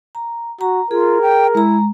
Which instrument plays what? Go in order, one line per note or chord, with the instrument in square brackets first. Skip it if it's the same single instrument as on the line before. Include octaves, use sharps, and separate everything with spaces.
[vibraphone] A#5
[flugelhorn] F#4 [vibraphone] A#5
[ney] F4 [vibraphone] G#4 [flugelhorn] A#4
[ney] G5
[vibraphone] G#3 A#5 [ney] E4